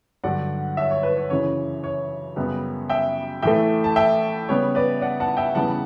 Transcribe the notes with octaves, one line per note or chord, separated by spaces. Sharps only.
G2 D3 F#3 D5 F#5
C#5 E5
C#5
B4
C#5
F#2 C#3 E3 C#5
C#5
F#2 C#3 G3 B3
E5 G5
A2 E3 A3 E5 G5
A5
E5 G5
C#3 G3 B3 C#5
B4 D5
D5 F#5
F#5 A5
E5 G5
E2 C#3 E3 G3 B3 F#5 A5